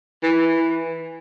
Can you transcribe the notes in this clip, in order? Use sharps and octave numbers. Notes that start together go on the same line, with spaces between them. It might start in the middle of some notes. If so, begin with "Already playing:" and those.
E3